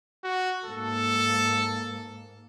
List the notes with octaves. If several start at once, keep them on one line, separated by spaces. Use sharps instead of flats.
F#4
G#2 A#3 A4